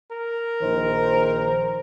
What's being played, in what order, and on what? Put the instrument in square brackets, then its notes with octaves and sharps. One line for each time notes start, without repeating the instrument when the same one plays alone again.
[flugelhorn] A#4
[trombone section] A#1 D#3 C5